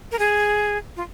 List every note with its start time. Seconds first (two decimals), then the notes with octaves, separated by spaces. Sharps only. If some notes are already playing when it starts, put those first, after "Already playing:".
0.12 A#4
0.19 G#4
0.96 F4